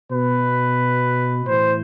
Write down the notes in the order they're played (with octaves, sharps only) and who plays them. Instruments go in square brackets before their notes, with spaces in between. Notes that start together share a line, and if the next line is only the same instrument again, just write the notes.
[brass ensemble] B2 B4
A2 E3 C5